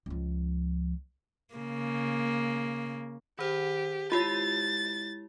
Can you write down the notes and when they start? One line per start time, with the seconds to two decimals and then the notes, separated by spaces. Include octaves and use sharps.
0.06 C#2 F3
1.55 C#3 A#3
3.39 D#3 G4 C5
4.12 G#3 E4 F4 G4 A6